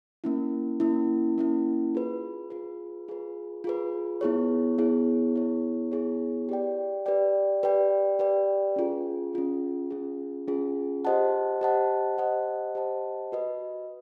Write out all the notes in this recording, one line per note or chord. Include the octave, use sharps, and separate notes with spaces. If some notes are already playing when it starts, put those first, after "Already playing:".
A#3 C#4 E4
A#3 C#4 E4
A#3 C#4 E4
F4 G#4 B4
F4 G#4 B4
F4 G#4 B4
F4 G#4 B4
B3 E4 G#4 C#5
B3 E4 G#4 C#5
B3 E4 G#4 C#5
B3 E4 G#4 C#5
G4 B4 D5 G5
G4 B4 D5 G5
G4 B4 D5 G5
G4 B4 D5 G5
C#4 F4 G#4
C#4 F4 G#4
C#4 F4 G#4
C#4 F4 G#4
G4 C5 D#5 F#5 A5
G4 C5 D#5 F#5 A5
G4 C5 D#5 F#5 A5
G4 C5 D#5 F#5 A5
F#4 B4 D#5